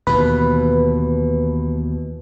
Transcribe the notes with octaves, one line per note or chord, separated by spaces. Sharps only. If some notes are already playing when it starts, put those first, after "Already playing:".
D#2 B2 E3 B4